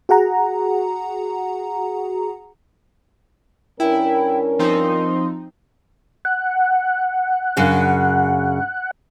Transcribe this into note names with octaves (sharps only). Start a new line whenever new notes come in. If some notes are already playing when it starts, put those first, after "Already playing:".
F#4 G#4 F#5 A#5
G2 C#4 E4 A#4 G5
F3 C4 D#4 C6
F#5
F#2 C#3 D4